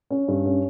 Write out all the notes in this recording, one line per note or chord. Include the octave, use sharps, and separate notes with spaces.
C#4
G2
C#4